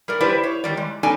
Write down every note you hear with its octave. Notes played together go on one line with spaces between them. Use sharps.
G3 A#4 D5
E4 G4 B4 C5 D5
C#5
D#3 G3 D5
G#3
B3 C#4 D#4 A4 D5 G#5